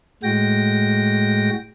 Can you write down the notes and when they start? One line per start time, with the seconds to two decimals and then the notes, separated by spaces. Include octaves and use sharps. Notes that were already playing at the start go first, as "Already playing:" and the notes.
0.23 A2 G#3 F#4 G5 A#6